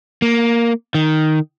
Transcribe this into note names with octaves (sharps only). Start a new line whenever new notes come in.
A#3
D#3